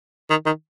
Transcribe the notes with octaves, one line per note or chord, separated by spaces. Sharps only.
D#3
D#3